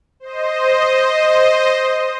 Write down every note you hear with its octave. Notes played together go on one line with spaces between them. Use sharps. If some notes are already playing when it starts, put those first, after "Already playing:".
C5 D#5